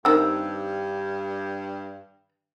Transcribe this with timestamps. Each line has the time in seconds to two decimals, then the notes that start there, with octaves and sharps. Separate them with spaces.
0.05 G2 D#3 C4 E6